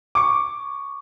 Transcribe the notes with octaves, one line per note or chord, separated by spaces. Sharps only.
C#6 D6